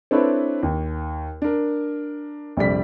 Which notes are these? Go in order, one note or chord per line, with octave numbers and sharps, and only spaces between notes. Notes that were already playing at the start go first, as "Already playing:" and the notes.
C4 D4 E4 A4 B4 C#5
D#2
D4 A#4
A#1 F2 C3 G3 D5 B6